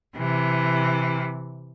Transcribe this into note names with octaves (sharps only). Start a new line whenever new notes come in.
C3 E3